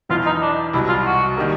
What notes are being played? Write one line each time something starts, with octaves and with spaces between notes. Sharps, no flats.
E2 B2 F#3 B3 E4 F4
D#4
D4
C2 B2 F#3 E4
F4
F#4
D#3 G3 A#3